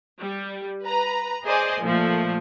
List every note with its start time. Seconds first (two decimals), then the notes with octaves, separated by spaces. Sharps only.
0.19 G3
0.84 B4 A#5
1.44 G#4 C5 D5 D#5 G#5
1.83 A#2 F3 A3